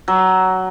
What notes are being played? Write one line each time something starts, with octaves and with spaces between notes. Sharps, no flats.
F#3